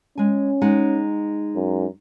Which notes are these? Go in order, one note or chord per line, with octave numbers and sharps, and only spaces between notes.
G#3 C#4 G#5
G#3 D#4 F#5
F#2